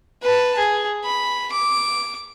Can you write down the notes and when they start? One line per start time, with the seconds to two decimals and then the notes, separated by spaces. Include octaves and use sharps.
0.23 B4 A5
0.58 G#4
1.05 B5
1.52 D6